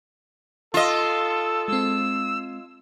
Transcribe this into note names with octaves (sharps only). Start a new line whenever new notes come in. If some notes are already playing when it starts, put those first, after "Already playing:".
F4 A4 D#5 E6
G#3 C4 E6